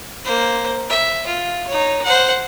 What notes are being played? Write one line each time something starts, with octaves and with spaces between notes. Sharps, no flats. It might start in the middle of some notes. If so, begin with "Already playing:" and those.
A#3 C5
E5
F4
D#4 C#5
C5 F#5